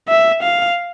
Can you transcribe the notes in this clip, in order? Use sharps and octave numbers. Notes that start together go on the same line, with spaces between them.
E5
F5